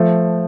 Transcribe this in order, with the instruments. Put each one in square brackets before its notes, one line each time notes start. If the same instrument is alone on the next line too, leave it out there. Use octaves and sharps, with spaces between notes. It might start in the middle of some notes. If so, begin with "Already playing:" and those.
Already playing: [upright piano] F3 A3